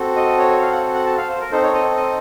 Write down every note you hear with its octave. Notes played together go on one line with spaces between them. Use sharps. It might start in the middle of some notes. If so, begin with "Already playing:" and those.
Already playing: C4 F#4 A4
D#5
C#5
F5
F#5
F#5
A5
F5
C5
A#4
C4 D#4 A4 C5
C#5
D#5
D#5